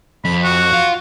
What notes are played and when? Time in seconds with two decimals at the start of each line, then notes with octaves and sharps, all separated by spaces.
0.25 F2 B5
0.43 F#4
0.73 F4